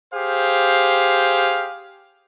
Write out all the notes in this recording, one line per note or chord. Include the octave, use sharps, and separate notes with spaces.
G4 G#4 C5 F5